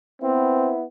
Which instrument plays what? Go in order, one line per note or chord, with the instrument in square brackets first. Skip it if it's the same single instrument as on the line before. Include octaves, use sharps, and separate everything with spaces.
[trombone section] B3 E4 [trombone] C4